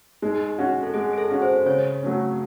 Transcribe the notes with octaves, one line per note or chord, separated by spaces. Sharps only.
G#3 D#4
C#4 F#4
A4
G#3 G#4
G#4
A4
C#4 F#4
C5
C#3 C#5
F#3 A3 C#4